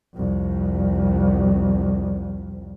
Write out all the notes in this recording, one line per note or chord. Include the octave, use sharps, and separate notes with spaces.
C2 F2